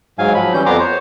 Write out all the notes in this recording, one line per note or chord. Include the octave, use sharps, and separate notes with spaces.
G#2 F#3 F5 G#5
F3 F#3 B5
E3 G3 C#4 G6
F2 F3 B3 A#5 C6 D6
C5 C#5